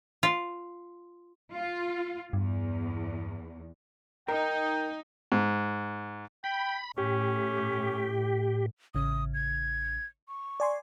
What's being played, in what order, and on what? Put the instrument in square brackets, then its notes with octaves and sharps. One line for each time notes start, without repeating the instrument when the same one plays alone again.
[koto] F4
[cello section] F4
[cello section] E2 [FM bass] G2
[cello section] D#4 [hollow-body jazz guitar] A#4 [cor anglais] G5
[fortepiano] G#2
[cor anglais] G5 [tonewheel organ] B5
[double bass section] A2 [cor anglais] C#4 [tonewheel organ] G4
[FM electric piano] A1 C#3 [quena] D#6
[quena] G#6
C#6
[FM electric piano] D5 G#5 C6